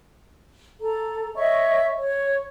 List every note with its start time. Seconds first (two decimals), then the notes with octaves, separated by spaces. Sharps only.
0.80 A4 A#5
1.35 C#5 D#5 E5 C#6
1.97 C#5